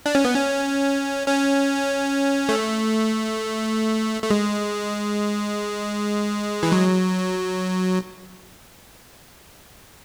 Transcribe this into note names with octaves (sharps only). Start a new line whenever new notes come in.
D4
C#4
B3
C#4
C#4
A3
A3
G#3
E3
F#3